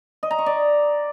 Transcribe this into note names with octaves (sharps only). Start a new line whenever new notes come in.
D#5
A#5
C#6
D5